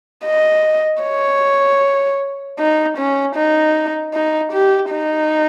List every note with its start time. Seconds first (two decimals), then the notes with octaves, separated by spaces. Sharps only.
0.25 D#5
1.03 C#5
2.59 D#4
2.98 C#4
3.36 D#4
4.14 D#4
4.53 G4
4.91 D#4